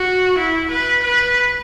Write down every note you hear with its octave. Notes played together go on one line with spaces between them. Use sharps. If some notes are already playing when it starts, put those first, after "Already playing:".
Already playing: F#4
E4
B4
B4